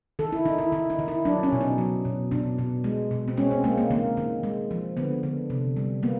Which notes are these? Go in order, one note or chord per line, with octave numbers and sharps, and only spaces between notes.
D#3 A4
E4
D#3 D#4
E4
D#3 E4
D#4
D#3
E4
F#3 D4
C#4
B2
D#4
F#3
B2
B2 D4
B2
G#3
B2
C4
G#3 C#4
C4
G#3 A#3
A#3
D#3 A#3
D#3
G#3
F3
D3 B3
D3
C3
G3
A#3 B3